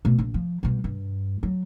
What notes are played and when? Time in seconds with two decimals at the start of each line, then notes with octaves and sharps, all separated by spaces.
0.05 B2 A3
0.18 A#1
0.34 F3
0.63 B2 G3
0.84 G2
1.43 F#3